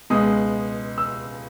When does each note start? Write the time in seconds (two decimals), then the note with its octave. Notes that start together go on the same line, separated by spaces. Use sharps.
0.10 C#2 B2 G#3 D#6
0.98 E6